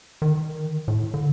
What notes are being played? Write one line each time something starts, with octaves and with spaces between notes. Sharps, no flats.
D#3
A2
D3